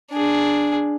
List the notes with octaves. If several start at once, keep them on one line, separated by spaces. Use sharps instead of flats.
D4 G#4